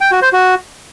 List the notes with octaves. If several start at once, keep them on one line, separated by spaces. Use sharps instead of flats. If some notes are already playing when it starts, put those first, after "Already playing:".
G5
F#4
C5
F#4